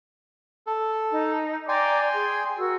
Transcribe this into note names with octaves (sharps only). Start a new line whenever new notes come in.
A4
D#4
D5 G5 G#5 A#5 C6 D6
G#4
F#4 A#4 E6